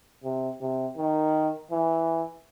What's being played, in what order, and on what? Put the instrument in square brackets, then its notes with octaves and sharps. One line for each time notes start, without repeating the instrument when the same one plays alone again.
[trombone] C3
C3
D#3
E3